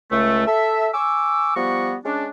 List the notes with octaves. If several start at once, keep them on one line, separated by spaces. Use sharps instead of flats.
C#2 A3
A4 E5
G#5 C#6 D6 E6
F3 G3 B3 F#4 C#6
G#3 C#4 D4